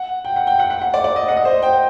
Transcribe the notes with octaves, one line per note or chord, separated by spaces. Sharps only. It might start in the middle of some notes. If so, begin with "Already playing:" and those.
Already playing: F#5
G5
F#5
G5
F#5
F#5
F#5
D5
D5
D#5
F#5
D#5
C5
G5